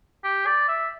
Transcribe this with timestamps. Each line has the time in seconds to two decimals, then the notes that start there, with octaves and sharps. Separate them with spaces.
0.24 G4
0.46 D5
0.68 E5